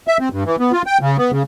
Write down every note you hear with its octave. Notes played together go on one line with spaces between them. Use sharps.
E5
C4
G2
E3
B3
F4
G5
C#3
B3
C#3